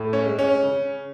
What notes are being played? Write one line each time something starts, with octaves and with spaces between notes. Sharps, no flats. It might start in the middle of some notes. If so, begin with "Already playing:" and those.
Already playing: A2
C#4
G#3
C#4
C#3